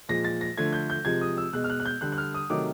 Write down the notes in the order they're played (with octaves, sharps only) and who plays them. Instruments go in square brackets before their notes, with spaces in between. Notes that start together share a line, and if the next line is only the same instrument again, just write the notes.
[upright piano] A#2 F3 G#3 A#6
A6
A#6
D3 F3 A3 G#6
G6
G6
C3 F3 G#3 G#6
D#6
E6
B2 G#3 F#6
F6
F#6
F#6
G6
D3 G3 F#6
F#6
F6
D#6
C3 D#3 F#3 A3 D6